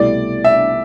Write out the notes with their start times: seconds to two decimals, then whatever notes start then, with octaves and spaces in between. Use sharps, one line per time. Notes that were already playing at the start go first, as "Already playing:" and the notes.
Already playing: C2 B2 A3 E4 G4 D5
0.44 E5